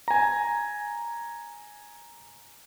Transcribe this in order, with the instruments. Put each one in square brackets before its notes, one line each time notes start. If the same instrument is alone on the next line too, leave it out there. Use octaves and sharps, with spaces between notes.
[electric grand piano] G#5 A#5